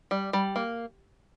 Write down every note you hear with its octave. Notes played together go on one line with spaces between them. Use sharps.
G3
G3
A#3